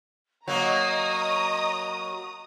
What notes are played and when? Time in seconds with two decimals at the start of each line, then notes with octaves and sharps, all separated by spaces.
0.48 F#3 A#3 D#5 A#5 C#6 D#6